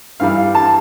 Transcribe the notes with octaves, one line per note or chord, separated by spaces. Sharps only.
G2 E3 G3 F5
A5